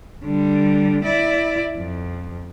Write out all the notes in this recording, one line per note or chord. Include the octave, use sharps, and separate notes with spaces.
D3 G3
E4 D5
F2